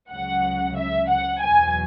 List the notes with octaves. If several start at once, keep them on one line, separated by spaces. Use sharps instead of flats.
C#2 C#3 F#3 F#5
E5
F#5
E2 B2 F#3 G#5